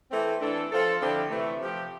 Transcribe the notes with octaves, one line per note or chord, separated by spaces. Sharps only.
E3 A3 C4
E3 A3 D4 A4
F3 C4 F4 A4
D3 F3 C4 E4 G4
C3 E3 A3
C3 F3 C4 G4